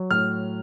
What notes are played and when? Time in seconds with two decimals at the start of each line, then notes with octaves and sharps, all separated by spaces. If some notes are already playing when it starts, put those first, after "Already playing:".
Already playing: F#3
0.11 A2 F6